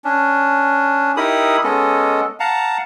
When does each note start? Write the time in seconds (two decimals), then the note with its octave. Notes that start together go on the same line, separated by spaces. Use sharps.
0.05 C#4 D4
1.17 D#4 E4 G4 A#4 B5 D#6
1.64 G#3 B3 C#4 A4 D#5
2.40 F5 F#5 A5 A#5